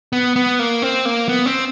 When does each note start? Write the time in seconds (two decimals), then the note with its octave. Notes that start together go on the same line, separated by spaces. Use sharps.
0.13 B3
0.36 B3
0.59 A#3
0.82 C4
1.05 A#3
1.29 B3
1.46 C4